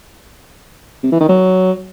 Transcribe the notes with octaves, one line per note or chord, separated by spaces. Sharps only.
C3
E3
D#3
F#3